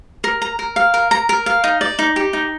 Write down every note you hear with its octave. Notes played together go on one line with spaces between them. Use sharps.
A#4
A#5
A#4
F5
A#4
A#5
A#4
F5
D#4
D5
D#4
G4
D#4